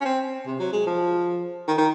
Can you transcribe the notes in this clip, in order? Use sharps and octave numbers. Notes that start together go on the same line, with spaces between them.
C#4
C4
C3
F#3
G#3
F3
D#3
D#3